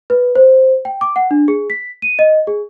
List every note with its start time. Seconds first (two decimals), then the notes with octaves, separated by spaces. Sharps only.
0.10 B4
0.35 C5
0.85 G5
1.01 D6
1.16 F#5
1.31 D4
1.48 G#4
1.70 B6
2.02 D#7
2.19 D#5
2.47 G#4